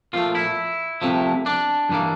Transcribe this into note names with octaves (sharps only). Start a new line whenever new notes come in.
A#2 F3 A3 F4
E4
C2 C3 F3 A3
D4
G2 E3 A#3